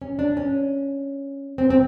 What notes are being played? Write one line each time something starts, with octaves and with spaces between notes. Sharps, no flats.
C#4
D4
C#4
C4
C4